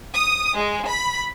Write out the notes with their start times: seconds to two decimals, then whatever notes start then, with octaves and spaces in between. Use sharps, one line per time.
0.14 D#6
0.56 G#3
0.88 B5